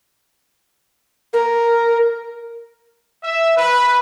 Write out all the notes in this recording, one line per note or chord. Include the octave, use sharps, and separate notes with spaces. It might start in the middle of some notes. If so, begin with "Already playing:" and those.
A#4
E5
B4